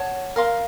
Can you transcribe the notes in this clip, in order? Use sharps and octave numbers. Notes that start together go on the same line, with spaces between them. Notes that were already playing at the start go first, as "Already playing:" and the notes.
Already playing: C#5 F#5 A5
A#4 F5 C6